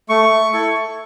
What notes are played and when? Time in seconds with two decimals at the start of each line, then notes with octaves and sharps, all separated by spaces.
0.09 A3 C#6
0.53 E4 A4